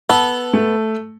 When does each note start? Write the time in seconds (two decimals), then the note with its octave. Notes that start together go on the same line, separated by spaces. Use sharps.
0.10 B3 A4
0.53 A3